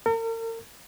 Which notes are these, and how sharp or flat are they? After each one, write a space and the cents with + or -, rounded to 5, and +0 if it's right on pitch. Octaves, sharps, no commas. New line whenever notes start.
A#4 -40